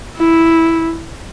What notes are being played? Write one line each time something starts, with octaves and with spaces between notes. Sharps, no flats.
E4